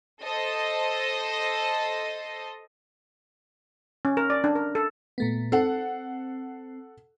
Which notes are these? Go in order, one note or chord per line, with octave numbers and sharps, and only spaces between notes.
A4 C5 D#5
C#4
A#4
D5
D4
A#4
A4
A#2 A3 B3
C4 A4 F#5